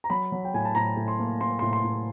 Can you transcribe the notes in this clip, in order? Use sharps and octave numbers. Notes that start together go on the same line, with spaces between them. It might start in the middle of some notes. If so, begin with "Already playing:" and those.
A#5
F#3 B5
F#3
G5
A2 G#5
A5
A2 A#5
A2
C6
A#3
A#3 C6
A2 C6
C6
A2